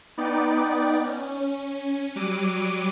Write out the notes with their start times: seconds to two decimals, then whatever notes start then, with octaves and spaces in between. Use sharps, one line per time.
0.17 B3 D#4 D5 G5
1.05 C#4
2.16 F#3 G3 D6 D7 D#7